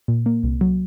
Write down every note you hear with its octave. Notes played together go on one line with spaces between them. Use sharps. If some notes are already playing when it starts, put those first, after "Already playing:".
A#2
A#3
C2
F#3